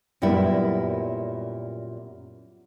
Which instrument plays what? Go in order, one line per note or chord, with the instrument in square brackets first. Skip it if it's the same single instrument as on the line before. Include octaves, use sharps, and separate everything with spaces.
[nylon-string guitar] F#2 A#2 G3 B3 E4